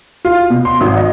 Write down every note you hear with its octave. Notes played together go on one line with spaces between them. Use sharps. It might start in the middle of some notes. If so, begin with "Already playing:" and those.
F4
B2
C6
G#1
D#5